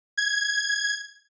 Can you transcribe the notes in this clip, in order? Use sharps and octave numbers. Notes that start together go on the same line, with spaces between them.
G#6